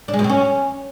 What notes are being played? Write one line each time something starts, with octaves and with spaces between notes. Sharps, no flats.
D4
G#3
B2
C4
C#4